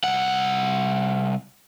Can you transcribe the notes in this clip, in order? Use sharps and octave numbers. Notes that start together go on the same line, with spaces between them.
C2 F#5